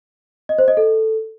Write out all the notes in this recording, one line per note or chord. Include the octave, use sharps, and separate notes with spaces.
D#5
C5
D#5
A4